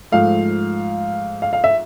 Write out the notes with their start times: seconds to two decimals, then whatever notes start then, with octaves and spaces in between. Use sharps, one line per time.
0.12 G#2 F3 A3 F5
1.42 F5
1.53 F5
1.64 E5